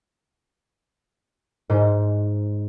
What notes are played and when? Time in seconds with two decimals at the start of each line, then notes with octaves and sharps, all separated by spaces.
1.70 G#2 C5